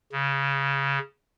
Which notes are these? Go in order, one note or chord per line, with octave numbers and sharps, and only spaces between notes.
C#3